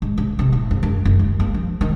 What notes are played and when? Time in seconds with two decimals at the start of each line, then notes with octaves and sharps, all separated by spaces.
0.02 G#2
0.18 C#3
0.39 C3
0.52 A2
0.71 F2
0.83 F#2
1.05 F#1
1.19 D#2
1.40 A#3
1.54 F3
1.81 D#3